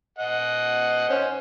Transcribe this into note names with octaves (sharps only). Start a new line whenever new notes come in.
D#5 F#5
C#4 C5